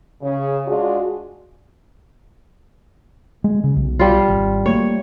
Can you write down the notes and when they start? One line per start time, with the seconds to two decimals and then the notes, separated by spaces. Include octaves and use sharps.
0.22 C#3
0.67 G#3 D4 F4 F#4 G#4
3.44 G#3
3.64 C#3
3.76 B1
3.99 G3 F4
4.29 G#1
4.66 F#3 A3 A#3 C#5